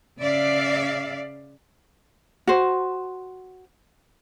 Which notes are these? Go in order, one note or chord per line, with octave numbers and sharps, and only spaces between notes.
C#3 D5 E5 F5
F#4 C5